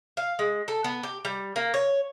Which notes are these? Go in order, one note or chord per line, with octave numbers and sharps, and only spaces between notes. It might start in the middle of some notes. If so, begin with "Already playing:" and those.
F5
G#3
A4
B3
G4
G3
A#3
C#5